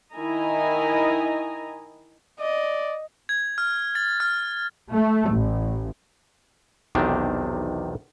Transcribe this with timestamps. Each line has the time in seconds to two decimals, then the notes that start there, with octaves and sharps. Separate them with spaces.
0.15 D#3 E4 D#5 G#5 A#5
2.40 D5 D#5
3.29 G#6
3.58 F6
3.95 A6
4.20 F6
4.92 A3
5.30 A1
6.95 B1 E2 C3 D#3 D4